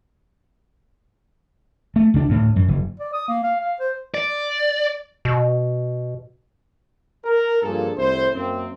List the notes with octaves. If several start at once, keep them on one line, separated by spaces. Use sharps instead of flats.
A3
C#2 D4
D2 A2
F#2
F#1
D5
D#6
A#3
F5
F5
C5
D5
B2
A#4
G2 A#2 F3 A#3 G#4 A4
C2 A2 E4 C5
F#2 A#3 C4